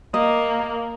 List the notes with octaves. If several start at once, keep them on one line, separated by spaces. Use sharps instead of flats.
A#3 D#5